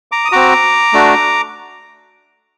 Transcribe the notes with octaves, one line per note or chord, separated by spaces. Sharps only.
A#5 D6
D#6
C4 F#4 A#5 D6
A3 D4 F#4